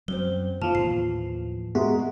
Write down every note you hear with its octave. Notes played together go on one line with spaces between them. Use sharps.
F#2 F#3 C4 C5 G7
D#2 B2 F3 A3 A5 F6 F7
A2 E3 C7
G#3 F#4 E5 A#5